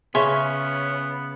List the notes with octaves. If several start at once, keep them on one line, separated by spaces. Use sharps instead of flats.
C#3 B3 C#4 E5 C6 C#6